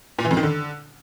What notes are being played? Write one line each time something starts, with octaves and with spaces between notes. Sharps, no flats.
A#2
E3
F2
D#3
D3